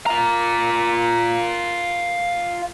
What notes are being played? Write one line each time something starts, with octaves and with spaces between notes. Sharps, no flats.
F4 A#5